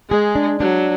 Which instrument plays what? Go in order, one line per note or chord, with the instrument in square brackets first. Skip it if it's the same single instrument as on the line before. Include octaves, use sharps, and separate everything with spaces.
[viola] G#3 [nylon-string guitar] G#4
[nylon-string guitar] D4
[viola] F#3 [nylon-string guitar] D4